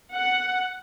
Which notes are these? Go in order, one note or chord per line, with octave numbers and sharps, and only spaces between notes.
F#5